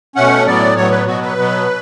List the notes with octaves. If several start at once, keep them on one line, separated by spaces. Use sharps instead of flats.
B2 A3 C#4 F#5
A2 F#3 B3 D5
A2 F#3 B3 C#5
B4
B2 F#3 B3 F#4
B4
B2 F#3 B3